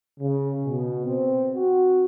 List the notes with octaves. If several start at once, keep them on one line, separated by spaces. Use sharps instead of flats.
C#3
B2
C4
F#4